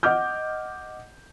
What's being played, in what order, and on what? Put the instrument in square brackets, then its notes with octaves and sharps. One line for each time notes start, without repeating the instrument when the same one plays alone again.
[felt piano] D#5 F#5 D6 F6 G6